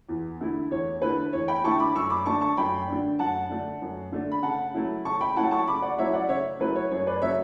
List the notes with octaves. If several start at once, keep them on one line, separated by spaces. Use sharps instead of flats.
E2
D3 A3 E4
E2 C#5
D3 A3 E4 B4
E2 C#5
G5 B5
D3 A3 E4 A5 C#6
B5 D6
F#2 C#6 E6
B5 D6
D3 A3 D4 A5 C#6
A5 C#6
F#2 G5 B5
D3 A3 D4
F#2 F#5 A5
D3 A3 D4
F#2
D3 A3 D4
B5
C#3 F#5 A5
F#3 A3 C#4 E4
C#3 A5 C#6
G5 B5
F#3 A3 C#4 E4 F#5 A5
A5 C#6
C#3 B5 D6
D5 F#5
F#3 A3 C#4 E4 C#5 E5
D5 F#5
C#3 C#5 E5
F#3 A3 C#4 E4 B4
C#5
F#2 C#5
B4 D5
C#3 F#3 A3 C#5 E5